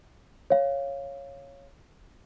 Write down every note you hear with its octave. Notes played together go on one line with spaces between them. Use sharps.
C#5 F5